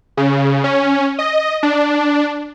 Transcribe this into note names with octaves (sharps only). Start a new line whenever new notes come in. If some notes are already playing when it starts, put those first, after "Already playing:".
C#3
C#4
D#5
D4